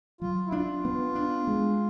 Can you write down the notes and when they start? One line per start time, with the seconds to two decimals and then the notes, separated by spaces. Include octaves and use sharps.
0.21 F#3 F4
0.46 E4
0.52 D4 F4
0.85 B3
1.15 D4
1.47 G#3